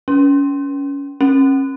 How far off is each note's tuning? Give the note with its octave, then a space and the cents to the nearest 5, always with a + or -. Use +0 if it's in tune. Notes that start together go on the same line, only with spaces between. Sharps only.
C#4 +25
C#4 -35